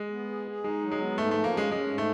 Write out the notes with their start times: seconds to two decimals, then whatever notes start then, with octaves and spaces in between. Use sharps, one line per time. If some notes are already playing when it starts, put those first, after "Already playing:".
Already playing: G#3
0.11 B3
0.29 G#4
0.48 G#4
0.64 G#3 D#4
0.82 F#3
0.92 G#3
1.00 B3
1.17 G#2 A3
1.31 F3 A3
1.44 A#3
1.53 G#3 C#4
1.71 G#3 C#4
1.88 G#2
1.98 A3